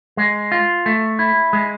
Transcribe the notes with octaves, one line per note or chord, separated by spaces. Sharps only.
G#3
F4
A3
E4
G#3